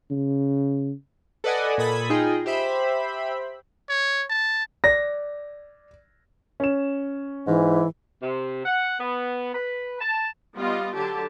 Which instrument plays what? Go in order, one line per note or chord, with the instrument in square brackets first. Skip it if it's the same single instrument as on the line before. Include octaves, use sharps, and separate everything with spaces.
[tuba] C#3
[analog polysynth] A4 B4 D5 D#5 F#5 G#5
A#2 A4 B5 D#6 G#6
D#4 F4 G#4 D#5 G5
G4 C5 E5 B5
[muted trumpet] C#5
A5
[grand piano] D5 A#6
C#4 E7
[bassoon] G#2 [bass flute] E3
[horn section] C3
F#5
B3
B4
A5
[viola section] G3 B3 F4 D#5
D3 F#3 G4 A5